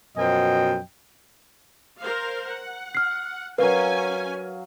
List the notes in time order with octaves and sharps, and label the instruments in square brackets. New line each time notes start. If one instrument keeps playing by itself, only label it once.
[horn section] F#2 B2 F3 D#5 G5
[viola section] A#4 C5 F5
F#5
[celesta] F6 C7
[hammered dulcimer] F#3 F5 [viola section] C#4 G#5 [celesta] A#4 B4